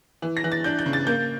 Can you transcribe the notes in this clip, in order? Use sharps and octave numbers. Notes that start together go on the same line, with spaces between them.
E3
A#6
E3
A6
D4 G6
G6
C#3
A6
A#3 G6